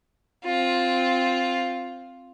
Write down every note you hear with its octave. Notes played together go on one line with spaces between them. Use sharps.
C4 F4